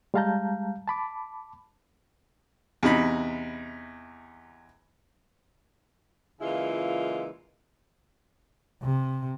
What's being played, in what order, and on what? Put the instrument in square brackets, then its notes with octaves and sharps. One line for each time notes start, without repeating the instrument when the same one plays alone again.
[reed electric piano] G3 G#3 F5 A5 A#5 G6
A5 B5 D6
[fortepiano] E2 C3 D#4 B5
[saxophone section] A#2 C#3 E3 G#3 E4 F4
[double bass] C3